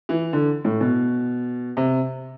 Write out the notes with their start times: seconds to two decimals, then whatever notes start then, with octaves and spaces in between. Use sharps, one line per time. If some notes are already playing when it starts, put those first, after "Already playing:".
0.09 E3
0.33 D3
0.65 A2
0.81 B2
1.77 C3